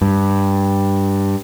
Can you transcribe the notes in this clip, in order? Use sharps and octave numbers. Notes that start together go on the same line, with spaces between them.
G2